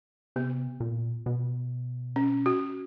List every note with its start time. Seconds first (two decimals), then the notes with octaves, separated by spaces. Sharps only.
0.36 C3 B3
0.80 A#2
1.26 B2
2.16 C#4
2.46 F#4